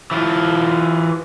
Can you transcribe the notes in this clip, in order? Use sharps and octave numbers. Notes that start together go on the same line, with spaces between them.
E3 F4